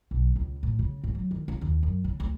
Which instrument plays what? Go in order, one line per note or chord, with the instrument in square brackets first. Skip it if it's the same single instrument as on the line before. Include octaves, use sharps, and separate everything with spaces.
[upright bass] B1
C#2
A2
C#3
G#2
F#3
D#3
C#3
D#2
F#2
C#3
D2